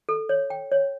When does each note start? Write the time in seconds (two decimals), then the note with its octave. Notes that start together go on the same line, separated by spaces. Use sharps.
0.09 A4
0.29 C#5
0.50 G5
0.71 C#5